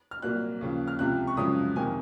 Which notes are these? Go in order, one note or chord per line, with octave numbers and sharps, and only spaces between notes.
F6
C2 A#2 F#3 A#3 F#6
D#2 C#3 F3
F6
C#2 C3 F3 F#6
C#6
F#2 C#3 F3 G#3 D#6
F2 C3 D#3 G#5